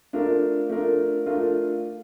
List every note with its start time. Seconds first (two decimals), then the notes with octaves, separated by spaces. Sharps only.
0.13 A3 D4 F4 A#4
0.69 A3 D4 F4 A#4
1.26 A3 D4 F4 A#4